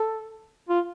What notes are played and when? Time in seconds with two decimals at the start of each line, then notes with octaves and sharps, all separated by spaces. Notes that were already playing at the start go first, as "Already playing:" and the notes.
Already playing: A4
0.69 F4